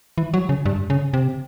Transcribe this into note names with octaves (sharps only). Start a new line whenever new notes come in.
E3
F#3
C#3
G2
C#3
C3